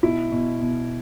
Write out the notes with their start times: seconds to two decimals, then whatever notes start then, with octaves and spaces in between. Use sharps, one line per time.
0.03 B2 E4
0.32 B2
0.61 B2